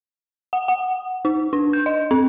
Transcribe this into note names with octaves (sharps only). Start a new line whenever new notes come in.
F#5
F#5
D#4
D4
G6
D#5
C4